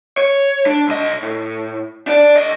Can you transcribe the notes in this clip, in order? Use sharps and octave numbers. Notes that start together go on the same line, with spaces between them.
C#5
D4
B1 D#5
A2
D4 D5
D2 D#5